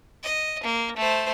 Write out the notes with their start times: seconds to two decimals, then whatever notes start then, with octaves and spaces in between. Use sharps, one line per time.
0.24 D#5
0.64 A#3
0.96 A3 C5